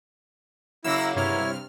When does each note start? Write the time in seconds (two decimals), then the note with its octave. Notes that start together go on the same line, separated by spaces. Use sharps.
0.84 C#3 F#3 A#3 E4 E6 A#6
1.16 G2 C3 E4 C#5 F6